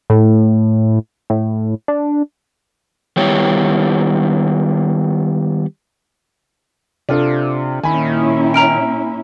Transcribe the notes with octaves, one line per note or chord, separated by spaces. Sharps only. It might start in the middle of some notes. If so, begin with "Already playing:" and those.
A2
A2
D4
D#3 G3 B3 E4 G4 C#5
C3 D4 F4 A4
A#2 D#3 C#4 E4 G#5 B5
A#5 F6 D7